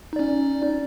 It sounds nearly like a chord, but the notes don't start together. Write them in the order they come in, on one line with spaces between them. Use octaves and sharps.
D#4 D5 C#4